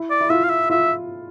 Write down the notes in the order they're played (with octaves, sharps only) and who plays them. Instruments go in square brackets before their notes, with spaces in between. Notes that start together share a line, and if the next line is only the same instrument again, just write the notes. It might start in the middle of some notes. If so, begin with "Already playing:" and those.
Already playing: [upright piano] E4
[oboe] D5
[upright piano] E4
[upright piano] F4 [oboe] E5
[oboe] F5
E5
[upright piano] F4 [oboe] E5